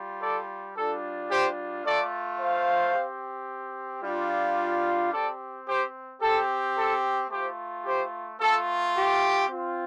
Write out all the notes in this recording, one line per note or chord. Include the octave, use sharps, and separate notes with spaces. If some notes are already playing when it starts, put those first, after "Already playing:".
Already playing: G3 F4
A4 D5
G3 D4 F4 A4
G4 C5
A3 F4 A4 D5
C5 F5
C4 G4
G3 D4 F4
C4 G4 A4 D5
G4 C5
C4 G4 A4
A4
A3 F4 G4 C5
G4 C5
A3 F4 A4
G4
C4 F4